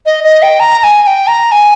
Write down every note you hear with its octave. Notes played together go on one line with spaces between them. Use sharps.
D#5
D#5
G5
A#5
A#5
G#5
G#5
G5
A#5
G#5